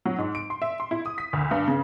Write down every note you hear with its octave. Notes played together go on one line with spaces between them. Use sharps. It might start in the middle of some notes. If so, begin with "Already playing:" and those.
F#3
G#2
D7
C6
E5
C6
E4
D#6
B6
D2
G2
C#3